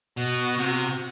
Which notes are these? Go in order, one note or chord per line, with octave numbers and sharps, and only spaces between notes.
B2 F#4
C3